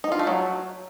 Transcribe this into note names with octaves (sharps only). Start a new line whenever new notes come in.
D#4
F4
A3
F#3